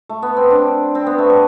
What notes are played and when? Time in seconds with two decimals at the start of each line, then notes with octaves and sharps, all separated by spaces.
0.09 A3
0.23 B3
0.37 C4
0.50 D4
0.95 C4
1.06 B3
1.19 A3
1.30 G3